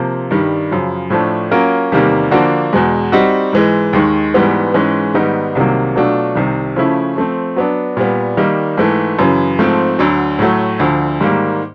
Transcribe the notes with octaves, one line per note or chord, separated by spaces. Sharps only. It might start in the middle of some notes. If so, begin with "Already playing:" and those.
Already playing: C3 F3 A#3
G2 D#3 G3
F#2 C#3 F3
A2 F3 A3 D4
F#3 A#3 C#4 F4 A#4
E2 C3 D#3 G3 A#3
D3 F3 A#3 D4 F#4
E2 B2 G#3
G3 C4 D#4 F#4
G#2 E3 G#3
D#2 D#3 G#3
G#2 E3 G3 B3
G#2 E3 G#3 C#4
G#2 D#3 G3 B3 D#4
C2 C3 D#3 F#3 A#3
B2 F#3 A3 D4 F4
C2 C3 D#3
C#3 F3 A3 C#4 E4
F3 A3 C4
F#3 B3 D4
A#2 G3 B3
D#3 G3 A#3 D#4
G#2 E3 A3
F#2 C#3 E3
G#2 F3 A3 C4
D2 D3 F#3
A2 F#3 A3
D2 D3 F3
G#2 D#3 G3 A#3